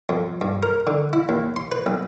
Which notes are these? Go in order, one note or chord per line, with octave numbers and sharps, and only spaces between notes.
F2
G2
A#4
D3
E4
D#2
C6
B4
B1